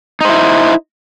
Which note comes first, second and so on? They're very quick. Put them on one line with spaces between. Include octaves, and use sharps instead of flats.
D#4 C5 E4